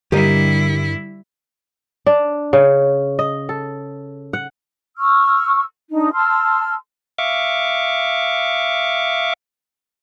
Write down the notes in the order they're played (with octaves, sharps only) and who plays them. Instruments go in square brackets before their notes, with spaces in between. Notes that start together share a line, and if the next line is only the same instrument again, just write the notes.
[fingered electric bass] G2 [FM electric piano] D3 [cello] G3 E4 [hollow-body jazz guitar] G4 A#4 D#5
[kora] D4
C#3
D#5
A4
F#5
[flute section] C#6 E6 F6
D4 D#4
A5 C6 E6 F6
[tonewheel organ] E5 F5 C#6 D6